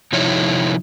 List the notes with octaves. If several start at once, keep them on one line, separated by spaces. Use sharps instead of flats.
C3 F3 D#4 E4 C#5